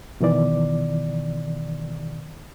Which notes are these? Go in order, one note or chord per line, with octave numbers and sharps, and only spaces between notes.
B2 D#3 E3 D5